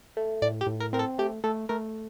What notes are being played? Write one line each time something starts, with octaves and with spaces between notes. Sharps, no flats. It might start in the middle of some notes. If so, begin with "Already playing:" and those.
A3
A2 D5
G4
A2
A#4
C4 A#4
A4
A3 G4
A3 A4
A3 A#4